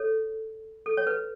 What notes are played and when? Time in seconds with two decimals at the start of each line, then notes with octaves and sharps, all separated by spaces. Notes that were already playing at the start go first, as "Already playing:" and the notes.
Already playing: A4 C#5
0.86 A4
0.97 C#5
1.07 B4